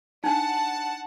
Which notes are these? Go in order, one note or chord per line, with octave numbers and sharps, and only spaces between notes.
D4 D#4 F#5 A5